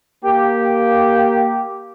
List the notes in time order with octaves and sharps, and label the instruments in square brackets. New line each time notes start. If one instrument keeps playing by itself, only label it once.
[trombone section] A#3 G4